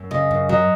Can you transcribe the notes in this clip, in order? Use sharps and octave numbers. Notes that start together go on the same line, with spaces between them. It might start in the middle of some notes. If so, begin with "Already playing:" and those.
Already playing: F#2
C#3 D#5
F#2
F#3 D#5